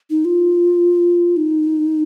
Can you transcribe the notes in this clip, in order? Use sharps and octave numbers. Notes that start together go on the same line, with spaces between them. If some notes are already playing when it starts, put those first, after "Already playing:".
D#4
F4
D#4